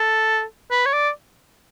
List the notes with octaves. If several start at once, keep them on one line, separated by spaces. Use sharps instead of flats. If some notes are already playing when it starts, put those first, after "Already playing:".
Already playing: A4
B4
C#5
D5